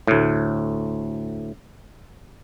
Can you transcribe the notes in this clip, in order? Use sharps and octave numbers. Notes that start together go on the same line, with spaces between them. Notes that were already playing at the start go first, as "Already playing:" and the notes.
D2 A2